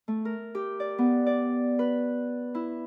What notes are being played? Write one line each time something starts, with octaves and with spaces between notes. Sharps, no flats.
A3
A#4
G4
D5
B3
D5
B4
E4